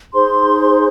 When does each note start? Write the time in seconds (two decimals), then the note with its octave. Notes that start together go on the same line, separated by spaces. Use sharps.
0.14 D#4 G#4 C5 C6